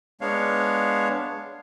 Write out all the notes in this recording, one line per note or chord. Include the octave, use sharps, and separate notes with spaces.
G#3 B3 D4 C#5 F5